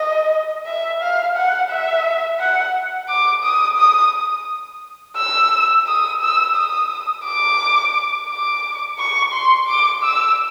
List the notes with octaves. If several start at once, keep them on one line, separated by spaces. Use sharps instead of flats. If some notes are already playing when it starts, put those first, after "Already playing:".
Already playing: D#5
E5
F5
F#5
E5
F#5
D6
D#6
D#6
E6
D#6
E6
D#6
D6
D6
C#6
C6
D6
E6